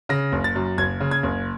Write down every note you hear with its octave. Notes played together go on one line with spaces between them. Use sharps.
C#3 A#6
F#1
A6
F#2
F#1 G#6
C#3
G#6
F#1